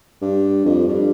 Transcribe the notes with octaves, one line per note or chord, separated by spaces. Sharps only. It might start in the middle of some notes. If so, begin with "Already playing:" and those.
G2
F2
G2